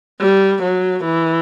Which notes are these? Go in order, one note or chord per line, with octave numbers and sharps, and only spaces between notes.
G3
F#3
E3